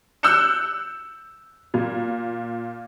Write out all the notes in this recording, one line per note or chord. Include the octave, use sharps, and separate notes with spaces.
E6 F#6 G6 C#7 E7
A#2